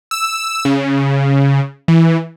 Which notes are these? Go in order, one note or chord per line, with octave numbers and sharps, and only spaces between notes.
E6
C#3
E3